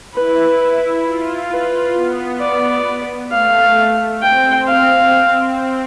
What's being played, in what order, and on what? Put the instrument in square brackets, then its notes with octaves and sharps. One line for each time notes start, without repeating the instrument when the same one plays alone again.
[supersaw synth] E4 [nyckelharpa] B4
[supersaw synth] F4
[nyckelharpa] B4
[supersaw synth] B3
[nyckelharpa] D5
[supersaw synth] A3 [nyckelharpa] F5
[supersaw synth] C4 [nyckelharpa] G5
[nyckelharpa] F5